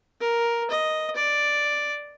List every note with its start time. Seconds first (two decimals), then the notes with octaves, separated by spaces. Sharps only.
0.21 A#4
0.70 D#5
1.16 D5